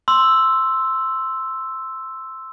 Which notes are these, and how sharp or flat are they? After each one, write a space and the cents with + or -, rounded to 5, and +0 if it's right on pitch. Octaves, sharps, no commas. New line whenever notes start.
C6 +0 E6 +0